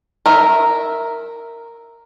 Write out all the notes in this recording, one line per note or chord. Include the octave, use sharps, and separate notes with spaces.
A#4 E5